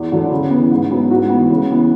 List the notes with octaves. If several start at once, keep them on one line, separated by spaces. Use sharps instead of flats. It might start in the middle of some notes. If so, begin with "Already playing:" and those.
Already playing: E2
D3 F#3
C#3
E3 B3
G#2
F#3 B3
G#2 F#4
E3 B3
C#3
E3 B3